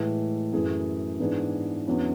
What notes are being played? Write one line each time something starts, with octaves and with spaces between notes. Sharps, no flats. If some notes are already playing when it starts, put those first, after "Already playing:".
Already playing: A2 E3 G#3
F#2 E3 A3 E4 G#4
G#2 E3 B3 D4 G#4
E2 D3 F#3 C#4 E4